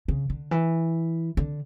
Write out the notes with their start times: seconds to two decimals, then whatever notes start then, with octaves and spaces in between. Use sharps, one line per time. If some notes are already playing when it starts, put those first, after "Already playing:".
0.08 C#3
0.30 D3
0.51 E3
1.37 D3